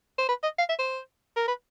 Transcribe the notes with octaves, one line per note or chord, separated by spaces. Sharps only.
C5
B4
D#5
F5
E5
C5
A#4
B4